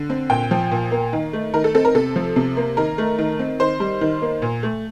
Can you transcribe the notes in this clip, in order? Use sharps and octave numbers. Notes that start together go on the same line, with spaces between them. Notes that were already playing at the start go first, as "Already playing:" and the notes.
Already playing: D3
C4
A#2 G5
F3
A#2
A#3
D#3
A3
D#3 A#4
A4
C4 A4
A#4
C3 A4
F3
C3
A#3
D#3 A#4
A3
D#3
C4
D#3 C5
G3
D#3
A#3
A#2
A3